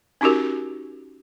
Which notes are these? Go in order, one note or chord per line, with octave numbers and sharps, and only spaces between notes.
C#4 D#4 F#4 G4 A#4